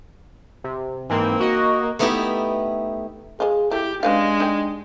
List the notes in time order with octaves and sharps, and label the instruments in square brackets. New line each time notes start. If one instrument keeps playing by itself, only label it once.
[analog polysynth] C3
[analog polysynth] G#2 E3 C4 [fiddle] A#3
[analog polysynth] F#4 D#5
[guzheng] A3 B3 D#4 E4 G4 A4
[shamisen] G#3 F4 [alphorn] G#4
[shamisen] A3 [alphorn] E4 [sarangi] G4
[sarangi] G#3 [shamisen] C#4 B4 F5 [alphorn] D4
[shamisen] D#4 G5